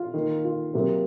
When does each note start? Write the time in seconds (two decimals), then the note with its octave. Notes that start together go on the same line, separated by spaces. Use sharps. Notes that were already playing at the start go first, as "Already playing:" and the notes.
Already playing: F4
0.14 D#3 A#3
0.44 F4
0.74 C3 F#3 A#3